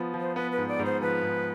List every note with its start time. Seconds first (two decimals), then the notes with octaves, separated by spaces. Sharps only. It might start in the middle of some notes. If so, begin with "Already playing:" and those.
Already playing: F3 B3
0.14 F3
0.20 C5
0.36 B3 B4
0.52 B4
0.58 G#2
0.68 D5
0.79 G#2
0.85 C5
1.02 F3 B4
1.23 G#2